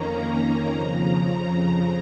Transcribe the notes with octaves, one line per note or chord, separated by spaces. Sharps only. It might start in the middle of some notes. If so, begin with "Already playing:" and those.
Already playing: F2 D#3 A#3 C#4 A#5
A#5
F2 C#3 F3